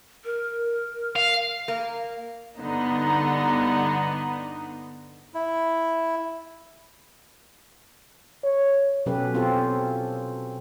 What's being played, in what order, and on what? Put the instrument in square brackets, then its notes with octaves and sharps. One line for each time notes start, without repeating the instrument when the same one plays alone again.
[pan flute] A#4
[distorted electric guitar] F5
[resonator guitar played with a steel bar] A#3
[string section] G2 D3 B3 D#4
[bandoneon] E4
[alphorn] C#5
[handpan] B2 F#3 C#4 G4 A4 B4
C4 F4 G4 A4